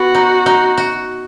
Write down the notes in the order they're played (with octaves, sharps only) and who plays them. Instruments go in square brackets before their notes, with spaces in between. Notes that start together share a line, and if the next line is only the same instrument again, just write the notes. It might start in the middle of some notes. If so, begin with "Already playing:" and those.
Already playing: [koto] B3 [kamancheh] F#4
[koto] D#4
D#4
F#4